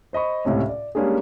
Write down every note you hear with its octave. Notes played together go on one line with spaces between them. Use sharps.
C5 D#5 B5 C#6
C#2 A2 C3 C#4
D5
G3 G#3 A#3 C#4 D4 G#4